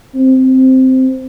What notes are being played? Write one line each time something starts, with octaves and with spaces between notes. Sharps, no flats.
C4